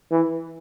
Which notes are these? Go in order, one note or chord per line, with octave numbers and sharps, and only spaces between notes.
E3